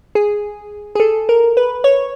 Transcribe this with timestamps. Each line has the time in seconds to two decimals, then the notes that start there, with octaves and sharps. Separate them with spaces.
0.15 G#4
0.95 G#4
1.00 A4
1.29 A#4
1.57 B4
1.84 C#5